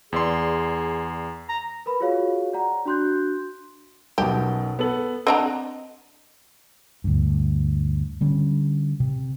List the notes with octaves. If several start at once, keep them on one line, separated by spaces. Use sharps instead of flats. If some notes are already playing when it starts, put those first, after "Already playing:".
E2 G#4 D5 C6
A#5
A#4 B4 B5
F4 F#4 G#4 C#5 F5
D5 F#5 A#5
D4 F#4 C6 F#6 G6
B1 F#2 B2 G4
B3 A4 F#7
C4 D4 D#5 F#5 A#5
D2 G2
D3 G3 C#4
C3